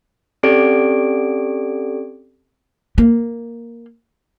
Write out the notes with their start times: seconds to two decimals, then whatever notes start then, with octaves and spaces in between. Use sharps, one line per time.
0.43 C4 C#4 G4 A4 D5 D7
2.98 A#3